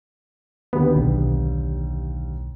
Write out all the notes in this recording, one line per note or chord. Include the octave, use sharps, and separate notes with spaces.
D#2 D3 B3 G4
B1